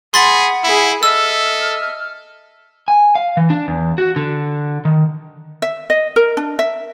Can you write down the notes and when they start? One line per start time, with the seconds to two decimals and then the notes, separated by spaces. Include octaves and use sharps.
0.14 G#4 F#5 B5 C6 A6 F#7
0.64 E4 G#4 B5
1.03 A4 D#5 E5 E6 F6
2.88 G#5
3.15 F5
3.37 E3
3.50 D4
3.68 E2
3.98 F#4
4.16 D3
4.85 D#3
5.62 E5
5.90 D#5
6.16 A#4
6.37 D4
6.59 E5